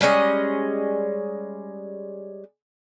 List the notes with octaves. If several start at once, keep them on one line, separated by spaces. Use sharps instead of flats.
G3 G#3 C#4 D#5